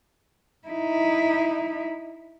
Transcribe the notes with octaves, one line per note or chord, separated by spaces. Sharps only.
D#4 E4